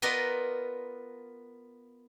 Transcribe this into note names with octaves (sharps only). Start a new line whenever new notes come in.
B3 F4 A#4 B4 D5 D#5